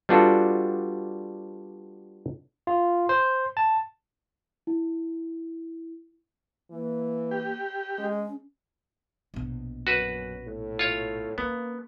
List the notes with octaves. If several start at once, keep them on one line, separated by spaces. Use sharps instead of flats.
G3 B3 D4 F4 F#4 A4
F4
C5
A5
E4
E3 A#3
G4
G#3 C#4
A#1 B2
F#2 F#4 B4
A2
F4 C#5
A#3 B3 C#4